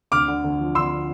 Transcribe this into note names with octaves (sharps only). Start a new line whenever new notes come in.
D2 D6 F6
D3
D2
F3
D3 C6 E6